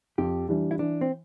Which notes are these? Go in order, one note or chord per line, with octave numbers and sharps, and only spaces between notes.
F2 G4
E3 G3 D4
E4
E3 D4
C4